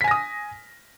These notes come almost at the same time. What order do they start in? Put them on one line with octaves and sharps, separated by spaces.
B6 G#5 A#6 D#6